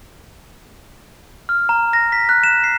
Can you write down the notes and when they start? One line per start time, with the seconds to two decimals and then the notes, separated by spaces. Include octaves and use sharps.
1.49 F6
1.69 A#5
1.93 A#6
2.12 B6
2.29 F#6
2.44 E7
2.64 C7